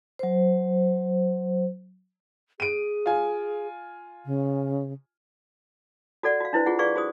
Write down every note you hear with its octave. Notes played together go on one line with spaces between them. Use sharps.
F#3 C5
G#4 D7 D#7
F4 G#5
C#3
F#4 A4 D5 F#5
F#4 F5
D4 E4 B4 C5
F4 G#4 F#5
G#4 B4 D5 F5 C#6
F#4 G#4 C5 D#6